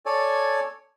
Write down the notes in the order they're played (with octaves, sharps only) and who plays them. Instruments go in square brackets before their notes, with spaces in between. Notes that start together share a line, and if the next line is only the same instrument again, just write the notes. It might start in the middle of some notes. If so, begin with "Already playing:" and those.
[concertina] A4 C#5 D5 G#5